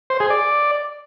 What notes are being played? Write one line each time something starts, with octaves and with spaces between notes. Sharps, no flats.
C5
G#4
D5